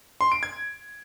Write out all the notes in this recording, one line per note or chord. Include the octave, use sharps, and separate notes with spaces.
C6
D7
G#6